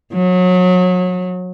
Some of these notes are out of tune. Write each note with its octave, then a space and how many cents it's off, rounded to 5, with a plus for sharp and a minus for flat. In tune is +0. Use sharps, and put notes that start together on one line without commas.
F#3 -30